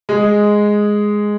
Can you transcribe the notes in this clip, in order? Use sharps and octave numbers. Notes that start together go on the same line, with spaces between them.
G#3